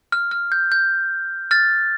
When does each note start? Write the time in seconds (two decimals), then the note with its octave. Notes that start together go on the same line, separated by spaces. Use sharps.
0.12 F6
0.31 F6
0.52 G6
0.72 G6
1.51 F6 A6